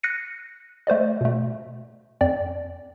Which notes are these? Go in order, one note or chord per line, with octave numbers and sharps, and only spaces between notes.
F#6 A#6 C7 C#7 D#7
A3 C5 D5 D#5
B2 A3
F2 D5 G5